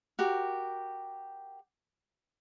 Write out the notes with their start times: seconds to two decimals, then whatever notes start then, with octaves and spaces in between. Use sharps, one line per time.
0.19 F#4 G4 A#4